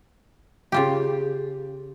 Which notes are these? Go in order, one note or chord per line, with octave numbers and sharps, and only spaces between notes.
C#3 F4 G4